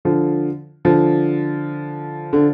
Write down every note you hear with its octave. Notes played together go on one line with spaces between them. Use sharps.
D3 F3
D3 F3
D3